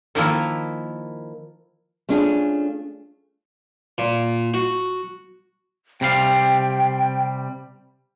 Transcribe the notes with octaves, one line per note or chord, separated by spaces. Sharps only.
D#3 F3 A#3 E4
A3 C#4 D4 F4 G#4
A#2
F#4
C3 G3 F5 G5